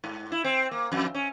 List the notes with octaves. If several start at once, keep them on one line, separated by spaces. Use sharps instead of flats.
G#2
E4
C4
A#3
F2
C#4